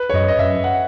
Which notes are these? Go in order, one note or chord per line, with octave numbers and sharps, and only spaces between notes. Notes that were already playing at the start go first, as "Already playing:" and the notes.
Already playing: B4
C#5
F#2 D#5
D#5
F#2 E5
F#5